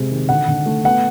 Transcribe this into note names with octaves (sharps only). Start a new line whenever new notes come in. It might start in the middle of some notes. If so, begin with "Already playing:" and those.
Already playing: C3 G#3
D#3
D3 F#5
D3
A3
B3 F#5